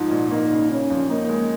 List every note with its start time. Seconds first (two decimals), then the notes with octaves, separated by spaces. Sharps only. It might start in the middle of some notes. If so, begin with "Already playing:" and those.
Already playing: G#2 F3 D#4
0.11 A#2
0.31 A#3 D#4
0.51 C#3
0.71 C#3 C#4
0.90 F2
1.09 A#3 D#4
1.29 G#3